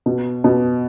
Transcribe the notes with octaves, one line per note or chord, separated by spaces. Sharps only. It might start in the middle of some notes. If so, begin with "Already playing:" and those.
B2
B2